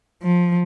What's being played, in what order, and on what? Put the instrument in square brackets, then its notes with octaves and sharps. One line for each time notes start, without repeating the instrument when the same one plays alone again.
[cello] F3